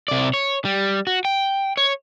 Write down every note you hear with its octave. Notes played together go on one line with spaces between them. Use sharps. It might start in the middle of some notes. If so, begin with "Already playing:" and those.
C3 D5
C#5
G3
F#4
G5
C#5